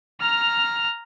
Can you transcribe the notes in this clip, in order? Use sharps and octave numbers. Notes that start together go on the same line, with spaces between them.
A#5 F6